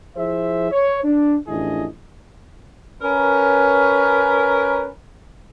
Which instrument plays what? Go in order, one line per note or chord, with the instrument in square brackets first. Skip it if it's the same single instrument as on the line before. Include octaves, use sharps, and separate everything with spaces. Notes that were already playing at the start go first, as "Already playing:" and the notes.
[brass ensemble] F3 E4 G#4 C5 E5
C#5
D4
A1 F2 D4 E4 G#4 D#5
[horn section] C#4 A#4 B4